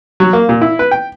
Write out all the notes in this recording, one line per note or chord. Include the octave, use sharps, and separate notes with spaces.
F#3
A#3
A#2
E4
B4
G5